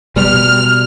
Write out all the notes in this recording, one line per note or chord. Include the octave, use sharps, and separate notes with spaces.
B2 G3 F6